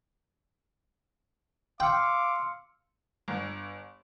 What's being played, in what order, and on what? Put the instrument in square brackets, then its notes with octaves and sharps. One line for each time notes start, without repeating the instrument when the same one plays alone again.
[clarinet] F5 [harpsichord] G5 [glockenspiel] C6 E6 C#7 [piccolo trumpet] D6
[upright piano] G1